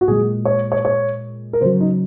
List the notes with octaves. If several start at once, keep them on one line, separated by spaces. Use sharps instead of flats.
F#4
A#2 G#3 G#4
C#5
C#5
C#5
A#4
C#3 F#3 C5
D#4